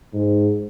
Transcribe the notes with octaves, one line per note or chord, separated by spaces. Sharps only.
G#2